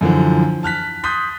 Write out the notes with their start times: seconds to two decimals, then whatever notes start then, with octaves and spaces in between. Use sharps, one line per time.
0.01 F#2 D3 E3 F3
0.63 A5 F6 F#6 B6
1.04 C6 D#6 F#6 G6 A6 B6